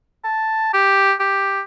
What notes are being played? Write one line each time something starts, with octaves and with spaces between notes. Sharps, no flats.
A5
G4
G4